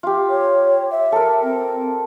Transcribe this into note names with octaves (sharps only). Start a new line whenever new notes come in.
F4 G4
C#5
E5
A4 A#4
C4